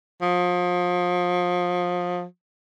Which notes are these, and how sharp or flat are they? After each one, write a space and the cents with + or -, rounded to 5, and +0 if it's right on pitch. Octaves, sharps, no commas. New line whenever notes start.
F3 +30